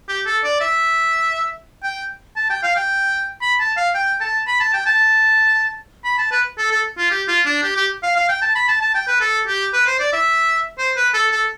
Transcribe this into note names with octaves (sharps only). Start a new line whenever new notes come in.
G4
A4
D5
E5
G5
A5
G5
F5
G5
B5
A5
F5
G5
A5
B5
A5
G5
A5
B5
A5
B4
A4
A4
F4
G4
F4
D4
G4
G4
F5
F5
G5
A5
B5
A5
A5
G5
B4
A4
G4
B4
C5
D5
E5
C5
B4
A4
A4